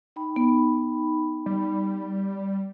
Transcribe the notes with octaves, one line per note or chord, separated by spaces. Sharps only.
D#4 G5 B5
B3
G3